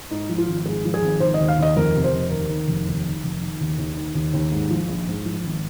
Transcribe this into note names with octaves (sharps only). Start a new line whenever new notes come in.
G#2 D#4
F3
F4
G#1
G#2 G#4
F3
G#4
G#1
D#3 C5
D#5
D#2
F5
D#2 D#5
F2 A#4
C3
C5
F1
D#2 A#4
D#3
F1
D#2
D#3
F1
D#3
D#2
D#2
D#3
D#2
D#2
G#2
F3
A#1
G#2
F3
G#1